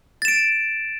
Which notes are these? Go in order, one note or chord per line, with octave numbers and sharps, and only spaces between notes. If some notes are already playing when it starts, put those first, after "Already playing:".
A6 D7 E7